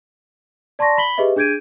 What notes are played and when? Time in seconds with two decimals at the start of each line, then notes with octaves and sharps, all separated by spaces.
0.79 D5 A5 C6 C#6 A#6
0.97 B5 B6 F#7 G7
1.18 G4 G#4 B4 D#5 E5
1.36 D4 G#4 G6 G#6 D7 D#7